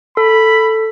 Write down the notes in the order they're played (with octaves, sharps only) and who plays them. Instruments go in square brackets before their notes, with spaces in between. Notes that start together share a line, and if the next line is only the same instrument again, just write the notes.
[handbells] A4 [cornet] B5